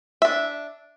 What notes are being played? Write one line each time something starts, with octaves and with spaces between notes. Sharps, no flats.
D4 E5